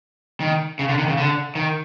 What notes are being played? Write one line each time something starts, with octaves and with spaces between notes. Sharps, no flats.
D#3
C#3
D3
D#3
C#3
D3
D#3